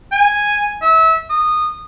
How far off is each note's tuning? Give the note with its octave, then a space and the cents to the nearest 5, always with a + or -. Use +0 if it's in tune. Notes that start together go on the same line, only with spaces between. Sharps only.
G#5 -5
E5 -30
D#6 -20